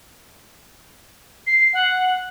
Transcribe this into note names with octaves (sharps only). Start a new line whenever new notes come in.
C7
F#5